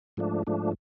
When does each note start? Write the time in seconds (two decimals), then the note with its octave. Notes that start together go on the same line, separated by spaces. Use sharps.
0.17 G#2 F3 A3 D4
0.47 G#2 F3 A3 D4